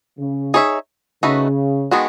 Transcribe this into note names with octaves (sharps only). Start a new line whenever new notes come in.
C#3
D#4 G#4 C#5 E5
C#3 A3 D#4 F#4 B4 E5
D#3 G#3 B3 F#4